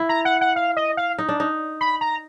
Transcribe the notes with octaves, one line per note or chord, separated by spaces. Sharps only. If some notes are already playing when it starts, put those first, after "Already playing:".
Already playing: E4
A#5
F#5
F#5
F5
D#5
F5
D#4
D4
D#4
B5
A#5